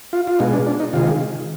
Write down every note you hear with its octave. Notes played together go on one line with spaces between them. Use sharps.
F4
F4
B2 G#3 D#4
D4
D4
D#4
C3 D#3 G#3 F4